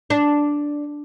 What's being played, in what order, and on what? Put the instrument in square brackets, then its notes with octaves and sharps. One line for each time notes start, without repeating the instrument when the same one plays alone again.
[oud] D4